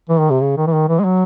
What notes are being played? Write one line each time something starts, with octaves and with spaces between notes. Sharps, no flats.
E3
D#3
C3
C#3
D#3
E3
D#3
E3
G#3
F#3